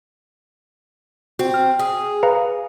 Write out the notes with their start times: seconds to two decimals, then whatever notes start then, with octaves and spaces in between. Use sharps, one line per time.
1.39 C4 F#4
1.54 F6
1.79 G#4
2.23 B4 F5 A#5